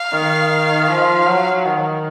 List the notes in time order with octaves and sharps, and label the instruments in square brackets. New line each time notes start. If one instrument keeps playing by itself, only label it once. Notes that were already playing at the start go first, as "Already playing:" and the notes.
Already playing: [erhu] F5
[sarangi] D#3
F3
F#3
D#3